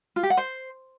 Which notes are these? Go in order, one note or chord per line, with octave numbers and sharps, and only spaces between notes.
F4
G4
F#5
C5